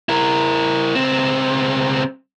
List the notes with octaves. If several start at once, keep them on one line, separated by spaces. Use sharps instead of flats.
E4 A#4
C#2 C4